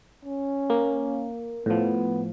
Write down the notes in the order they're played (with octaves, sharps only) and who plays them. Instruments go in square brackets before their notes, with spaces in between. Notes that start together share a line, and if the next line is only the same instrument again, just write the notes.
[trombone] C#4
[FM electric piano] A#3
[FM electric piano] A2 F3 [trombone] B3